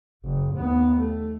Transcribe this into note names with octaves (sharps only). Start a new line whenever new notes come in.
F#1
D#2 B3
A3